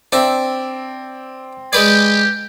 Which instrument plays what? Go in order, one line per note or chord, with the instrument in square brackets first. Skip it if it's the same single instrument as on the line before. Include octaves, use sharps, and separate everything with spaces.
[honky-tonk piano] C4 [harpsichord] D4 E5
[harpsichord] G#3 B4 D5 [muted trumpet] G4